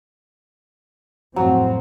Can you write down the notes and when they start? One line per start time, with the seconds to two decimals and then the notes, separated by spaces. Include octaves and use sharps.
1.36 F2 A2 F#3 C4